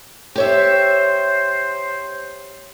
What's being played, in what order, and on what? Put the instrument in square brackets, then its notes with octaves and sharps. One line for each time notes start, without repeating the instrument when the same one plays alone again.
[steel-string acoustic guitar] G4 C#5 E5 [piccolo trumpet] C5